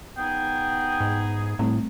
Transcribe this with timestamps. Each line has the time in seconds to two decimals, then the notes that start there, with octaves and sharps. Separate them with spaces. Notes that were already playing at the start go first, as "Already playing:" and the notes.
0.18 B3 D#4 G#4 G5
1.00 G#2
1.59 A2 G3 A3 C4